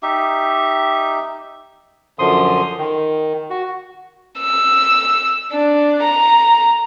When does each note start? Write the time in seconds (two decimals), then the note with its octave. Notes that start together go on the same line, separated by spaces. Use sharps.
0.03 D#4 G4 E5
2.19 F#2 D3 F3 C6 D#6
2.78 D#3
3.50 F#4
4.40 E6
5.52 D4
6.03 A#5